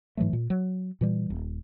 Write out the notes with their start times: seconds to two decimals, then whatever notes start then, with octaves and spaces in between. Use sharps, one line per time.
0.17 G#2 E3 F#3 A3
0.33 A#2
0.50 F#3
1.01 A#2 E3 G3
1.30 D#1